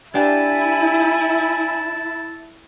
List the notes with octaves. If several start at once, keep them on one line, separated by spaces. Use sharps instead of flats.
D4 E4 G4 G#5 A5